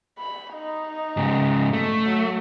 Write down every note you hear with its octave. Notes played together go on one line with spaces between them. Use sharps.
B5
D#4
G#2 C#3
A3
F#3